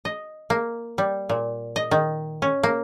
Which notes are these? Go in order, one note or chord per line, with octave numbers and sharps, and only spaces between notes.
D#5
A#3
G3
A#2
D#5
D#3
C#4
A#3